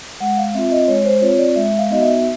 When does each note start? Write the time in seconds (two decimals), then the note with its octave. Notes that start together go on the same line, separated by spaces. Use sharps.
0.20 G#3 F#5
0.37 F5
0.54 C4 F4 E5
0.71 D#5
0.88 G#3 C#5
1.05 C5
1.21 C4 F4 C#5
1.38 D5
1.55 G#3 E5
1.78 F5
1.89 B3 D#4 F#4 D#5
2.01 E5